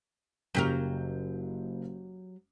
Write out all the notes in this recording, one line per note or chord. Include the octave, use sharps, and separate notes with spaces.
F#1 C#3 F#3 G4 A#4 G6